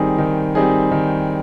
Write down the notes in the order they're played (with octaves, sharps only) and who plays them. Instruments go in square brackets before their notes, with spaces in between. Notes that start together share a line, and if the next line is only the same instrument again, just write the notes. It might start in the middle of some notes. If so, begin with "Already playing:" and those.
Already playing: [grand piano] D#3 G3 C4 D#4 G#4
D#3
G3 C4 D#4 G#4
D#3